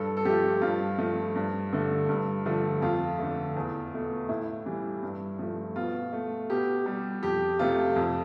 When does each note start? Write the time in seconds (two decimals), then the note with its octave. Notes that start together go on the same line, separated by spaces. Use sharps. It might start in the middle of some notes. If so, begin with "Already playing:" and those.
Already playing: G2 A4
0.17 A4
0.25 F3 A3 G4
0.62 G2 F4
0.98 F3 A3
1.35 G2
1.73 D3 A3
2.09 G2
2.46 D3 F3 A3
2.82 F2 F4
3.19 D3 A3
3.56 E2
3.93 B2 A3
4.29 A2 E4
4.66 E3 G3
5.03 G2
5.39 F3 A3
5.76 B2 F4
6.13 A3
6.50 B2 G4
6.86 G3
7.23 F2 G4
7.59 C3 F3 A3 F4
7.96 F2